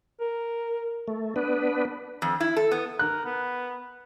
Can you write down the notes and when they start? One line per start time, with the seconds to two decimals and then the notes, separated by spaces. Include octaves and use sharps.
0.20 A#4
1.08 A3
1.36 B3 D4 B4
2.22 F2
2.40 E4
2.56 A4
2.71 B3
2.99 A#4 F#6
3.25 B3